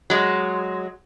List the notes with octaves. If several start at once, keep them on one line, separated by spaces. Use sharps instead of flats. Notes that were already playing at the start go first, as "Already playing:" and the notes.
F#3 G#3